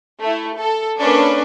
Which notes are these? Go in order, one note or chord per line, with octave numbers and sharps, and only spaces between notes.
A3 E4
A4
A#3 C#4 D4 A4 B4